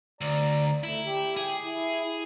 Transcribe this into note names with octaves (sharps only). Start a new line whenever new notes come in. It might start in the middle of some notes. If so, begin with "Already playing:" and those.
D2 D5 A#5
A3 E4
G4
G#4
E4